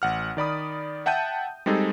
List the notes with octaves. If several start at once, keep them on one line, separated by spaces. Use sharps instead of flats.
A1 F#5 F6
D#3 D5 B5 D#6
E5 F#5 G5 A5 G6 D#7
G3 G#3 C4 D#4 G#4 A4